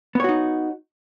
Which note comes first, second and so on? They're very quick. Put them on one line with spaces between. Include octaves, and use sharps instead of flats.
B3 C#5 F#4 D#4